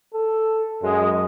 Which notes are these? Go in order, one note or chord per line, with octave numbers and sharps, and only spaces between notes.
A4
F#2 G#3